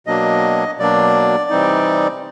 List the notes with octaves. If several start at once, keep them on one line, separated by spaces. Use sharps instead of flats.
B2 F#3 A#3 D4 D#5
B2 F#3 A#3 D4 D5
C3 E3 G3 C4 D#4